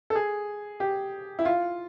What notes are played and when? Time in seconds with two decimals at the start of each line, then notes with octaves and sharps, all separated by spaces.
0.10 A4
0.15 G#4
0.80 G4
1.39 E4
1.45 F4